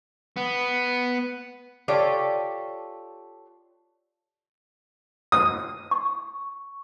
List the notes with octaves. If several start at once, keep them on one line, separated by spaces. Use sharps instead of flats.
B3
F4 G4 A4 C#5 D5
D#6
C#6